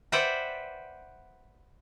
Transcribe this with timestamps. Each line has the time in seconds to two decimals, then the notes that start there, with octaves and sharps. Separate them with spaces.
0.12 B4 C5 D5 E5 F#5 G5